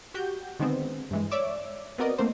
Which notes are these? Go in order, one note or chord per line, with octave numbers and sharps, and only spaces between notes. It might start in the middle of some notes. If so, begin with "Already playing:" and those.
F#4 G4 G6
D3 D#3 G#3 B3 C4
G2 E3 G#3
C#5 D5 E5 D6 E6
B3 C4 F#4 A#4 D5 D#5
D#3 A3 A#3 C4 C5